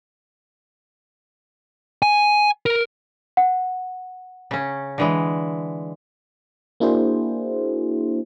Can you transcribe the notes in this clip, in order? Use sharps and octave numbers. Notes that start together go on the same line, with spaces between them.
G#5
A#4
F#5
C#3 C#4
D3 E3 G#3
A#3 D4 E4 F#4 G#4 C5